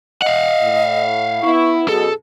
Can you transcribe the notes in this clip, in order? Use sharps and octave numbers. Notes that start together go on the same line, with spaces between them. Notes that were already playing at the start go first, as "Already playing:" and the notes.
D#5 F5 F#5
A2
B3 E4 C#6
F#2 B2 G#4 A4